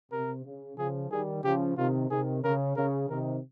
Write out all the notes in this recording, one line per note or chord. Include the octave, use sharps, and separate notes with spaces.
C3 A#4
C#3
C#3 F3 G#4
D#3 G3 G#4
C#3 F3 G4
C3 D#3 F4
C3 D#3 G#4
C#3 A#4
C#3 A#4
C3 D#3 A#4